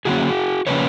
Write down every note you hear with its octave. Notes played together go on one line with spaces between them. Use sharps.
D3 F#3 A#3 C#4 F#4 G#4
C#3 F3 A#3 C#4 B4 C#5